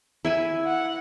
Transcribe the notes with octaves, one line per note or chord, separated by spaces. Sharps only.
E4 E5 G#5
F#5